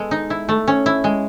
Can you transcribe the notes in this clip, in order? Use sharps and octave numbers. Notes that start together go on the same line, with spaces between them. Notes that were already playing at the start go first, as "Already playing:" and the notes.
Already playing: G#3 B3 A4
D#4
E4
A3
C#4
E4
G#3